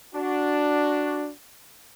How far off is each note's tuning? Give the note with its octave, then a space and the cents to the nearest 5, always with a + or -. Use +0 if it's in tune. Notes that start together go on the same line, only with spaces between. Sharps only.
D4 +0 F#4 +0